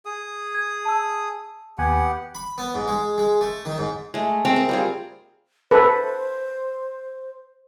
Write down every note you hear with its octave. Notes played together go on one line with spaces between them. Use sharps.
G#4 D#6
G#6
A5 E6
D#2 B3 G4 F#5 G#5
B5
B3
G#2
G#3
G#3
A3
D#3
G#2
G#3 A3
G#3 C4
A#4
G3 F4 G#4
A4 B4 C5